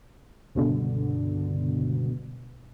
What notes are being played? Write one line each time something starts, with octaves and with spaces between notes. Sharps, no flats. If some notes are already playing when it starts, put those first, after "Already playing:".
C#2 G2 B2 D3